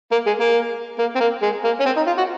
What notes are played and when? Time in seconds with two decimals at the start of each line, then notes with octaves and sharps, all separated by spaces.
0.11 A#3
0.26 G#3
0.40 A#3
0.98 A#3
1.15 C4
1.20 A#3
1.42 G#3
1.64 A#3
1.80 C#4
1.86 C4
1.96 D#4
2.07 F4
2.18 F#4